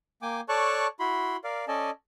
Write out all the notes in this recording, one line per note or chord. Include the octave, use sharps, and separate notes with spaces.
A#3 G5 G#5 D6
A4 C#5 D5 A5 C#6 F#6
E4 F#4 B5 C6
A#4 D5 F5
C#4 A4 D5 D#5 G#5 A5